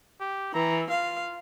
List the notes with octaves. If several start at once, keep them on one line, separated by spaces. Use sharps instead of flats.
G4
E3 A#5
F4 F5